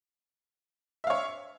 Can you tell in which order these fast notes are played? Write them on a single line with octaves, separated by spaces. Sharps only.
E5 F5 C#5